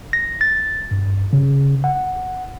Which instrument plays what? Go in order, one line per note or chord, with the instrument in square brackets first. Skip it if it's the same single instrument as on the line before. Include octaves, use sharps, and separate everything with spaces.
[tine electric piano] A#6
A6
G2
C#3
F#5